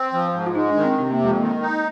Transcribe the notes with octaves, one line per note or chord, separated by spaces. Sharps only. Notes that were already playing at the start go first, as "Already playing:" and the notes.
Already playing: C4
F3
G#2
F4
G#3 D#4
D4
D#3
C4
C3 C4
A#3
F2 G#3
D#3 A#3
D#4